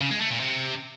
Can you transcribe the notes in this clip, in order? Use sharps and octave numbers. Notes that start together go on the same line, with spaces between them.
C#3
G#3
A3
A#2
C3